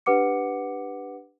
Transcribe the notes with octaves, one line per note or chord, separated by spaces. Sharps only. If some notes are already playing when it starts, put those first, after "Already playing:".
D4 G4 B4 F#5 D6 C#7